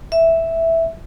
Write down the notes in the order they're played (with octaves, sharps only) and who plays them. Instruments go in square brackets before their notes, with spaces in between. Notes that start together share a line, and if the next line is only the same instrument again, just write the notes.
[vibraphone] E5